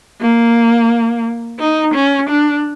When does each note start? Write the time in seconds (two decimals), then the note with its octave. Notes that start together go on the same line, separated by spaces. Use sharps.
0.21 A#3
1.59 D#4
1.94 C#4
2.30 D4